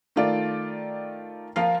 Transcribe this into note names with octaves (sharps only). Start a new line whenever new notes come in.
D#3 A3 F4 D5
F3 F4 A#4 F5